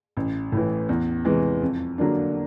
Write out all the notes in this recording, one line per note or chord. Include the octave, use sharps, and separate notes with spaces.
A1
A2 E3
E2
C3 E3 G#3
F2
D3 F#3 A#3 D4